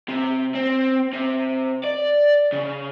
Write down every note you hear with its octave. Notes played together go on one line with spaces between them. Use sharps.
C3
C4
C3
D5
C#3